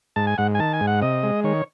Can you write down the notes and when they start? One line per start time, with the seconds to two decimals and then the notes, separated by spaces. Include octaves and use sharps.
0.16 G#2 A5
0.27 G#5
0.38 G#2 F#5
0.55 G#5
0.59 D#3 A5
0.73 G#5
0.81 G#2
0.87 F#5
1.02 C3 D#5
1.23 G#3
1.44 D#3 C#5